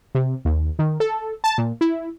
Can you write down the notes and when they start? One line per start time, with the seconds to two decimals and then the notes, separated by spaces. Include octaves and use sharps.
0.15 C3
0.45 D#2
0.79 D#3
1.00 A4
1.44 A5
1.58 A#2
1.81 E4